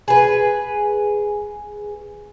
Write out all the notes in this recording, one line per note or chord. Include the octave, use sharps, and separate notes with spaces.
G#4 B4